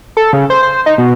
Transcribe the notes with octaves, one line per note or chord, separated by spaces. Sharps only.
A4
C#3
C5
C5
D#4
B2